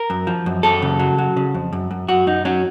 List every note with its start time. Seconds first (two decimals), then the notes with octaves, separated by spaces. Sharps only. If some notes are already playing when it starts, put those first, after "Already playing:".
Already playing: A#4
0.10 F#2
0.27 F3
0.46 F#2
0.63 F#2 A4
0.82 C#3
1.00 F#3
1.18 F#3
1.37 C#3
1.55 F2
1.73 F#2
1.91 F#2
2.08 F#2 F#4
2.27 F#2 D#4
2.45 F#3 C#4